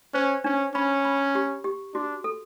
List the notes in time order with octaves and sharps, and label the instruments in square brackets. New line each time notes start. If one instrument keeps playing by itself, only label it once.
[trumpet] C#4 [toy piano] C5
[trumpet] C#4 [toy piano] D4
[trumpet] C#4 [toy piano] B5
[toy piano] B5
G4
G4
[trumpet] D4 [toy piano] F#4
[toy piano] A4